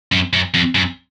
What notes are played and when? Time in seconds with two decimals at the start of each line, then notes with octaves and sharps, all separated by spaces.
0.12 F#2
0.33 F#2
0.54 F2
0.75 F#2